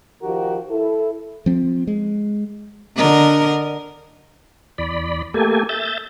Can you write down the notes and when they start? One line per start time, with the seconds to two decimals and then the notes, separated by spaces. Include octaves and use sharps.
0.22 D#3 F3 F#4 G4 A#4
0.71 E4 A4
1.46 F3 C4
1.87 G#3
2.96 D3 A#4 D#5
4.78 E2 D5 B5
5.34 A3 A#3 G4 A4 G#5
5.69 E5 G6 A6